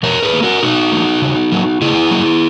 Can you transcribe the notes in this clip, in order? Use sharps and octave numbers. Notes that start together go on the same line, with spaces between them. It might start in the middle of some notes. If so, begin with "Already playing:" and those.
B2 A#4 C#5
G#4 B4
A#3
F#4 A#4
B2 D#4 F#4
A#3
C#3
F#3 A#3
C#3 E4 G#4
F#3 A#3